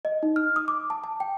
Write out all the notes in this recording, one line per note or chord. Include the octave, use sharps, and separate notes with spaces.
D#5
D#4
F6
D#6
D6
A5
A5
G5